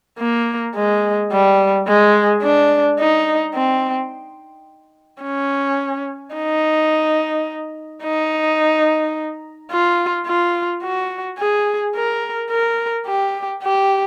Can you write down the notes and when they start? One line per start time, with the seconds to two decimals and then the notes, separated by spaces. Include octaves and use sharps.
0.19 A#3
0.75 G#3
1.32 G3
1.87 G#3
2.43 D4
3.00 D#4
3.55 C4
5.22 C#4
6.35 D#4
8.03 D#4
9.71 F4
10.27 F4
10.83 F#4
11.39 G#4
11.95 A#4
12.50 A#4
13.07 G4
13.63 G4